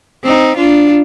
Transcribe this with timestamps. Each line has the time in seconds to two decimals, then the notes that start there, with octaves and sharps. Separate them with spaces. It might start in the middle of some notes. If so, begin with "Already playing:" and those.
0.24 C4 D#4
0.57 D4 F4